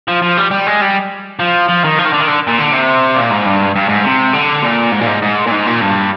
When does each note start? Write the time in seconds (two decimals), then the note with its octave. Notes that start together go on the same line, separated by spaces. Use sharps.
0.08 F3
0.22 F3
0.37 G3
0.51 G3
0.67 G#3
0.81 G3
1.39 F3
1.69 F3
1.84 D#3
1.98 F3
2.05 D#3
2.13 D3
2.20 D#3
2.28 D3
2.47 A#2
2.58 D3
2.72 C3
3.16 A#2
3.31 G#2
3.45 G2
3.75 G2
3.89 G#2
4.04 C3
4.34 D3
4.63 A#2
4.92 G#2
5.01 A#2
5.07 G#2
5.22 G#2
5.47 A#2
5.51 G#2
5.66 A#2
5.81 G2